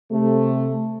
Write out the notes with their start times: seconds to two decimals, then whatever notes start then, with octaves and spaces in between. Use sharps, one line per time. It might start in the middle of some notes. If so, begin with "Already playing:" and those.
0.10 C3 A3